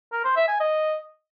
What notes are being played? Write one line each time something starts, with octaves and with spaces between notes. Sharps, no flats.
A#4
C5
E5
G#5
D#5